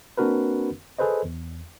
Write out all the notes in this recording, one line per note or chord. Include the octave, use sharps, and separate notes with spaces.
A#3 C4 D4 F#4 A#4 B4
G#4 A4 B4 C5 D#5
E2